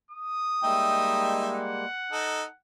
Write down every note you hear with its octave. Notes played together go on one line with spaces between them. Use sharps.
D#6
G3 G#3 A#3 D#4 E5 G5
F#5
D#4 A4